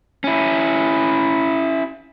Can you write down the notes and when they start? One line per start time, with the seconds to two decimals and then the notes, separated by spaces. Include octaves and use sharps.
0.24 C#4 E4